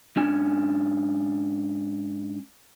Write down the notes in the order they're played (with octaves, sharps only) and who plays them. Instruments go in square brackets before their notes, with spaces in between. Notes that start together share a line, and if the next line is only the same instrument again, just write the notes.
[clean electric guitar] G#2 C#4 D4 G#5